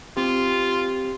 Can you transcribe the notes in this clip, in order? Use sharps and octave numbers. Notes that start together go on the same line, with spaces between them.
C4 F4 G4